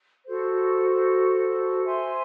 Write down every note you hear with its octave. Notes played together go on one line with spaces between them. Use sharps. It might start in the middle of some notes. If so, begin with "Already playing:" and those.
F#4 A4 C5
C5 E5 G#5 C6